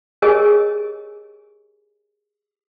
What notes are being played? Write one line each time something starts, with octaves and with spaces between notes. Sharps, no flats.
G4 G#4 A#4 C#5 D#5 G#5